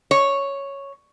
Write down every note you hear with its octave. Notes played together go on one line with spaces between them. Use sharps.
C#5